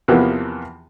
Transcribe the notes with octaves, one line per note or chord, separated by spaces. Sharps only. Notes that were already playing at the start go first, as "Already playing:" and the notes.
E2 C3 E3 F3 A#3 B3